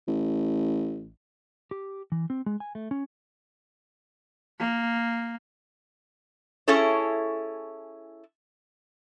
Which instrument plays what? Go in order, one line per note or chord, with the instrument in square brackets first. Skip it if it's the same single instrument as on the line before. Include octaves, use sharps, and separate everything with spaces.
[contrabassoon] A1
[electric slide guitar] G4
E3
C4
G#3
G#5
A3
C#4
[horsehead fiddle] A#3
[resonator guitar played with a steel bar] C#4 E4 G#4 A4 C#5